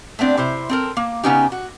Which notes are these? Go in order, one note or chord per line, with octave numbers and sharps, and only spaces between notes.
A3 B3 C4 D4
C3 E4 C5
C4 A4 A#4
A#3
C#3 G#3 B3 C#4 D#4 G4
F#4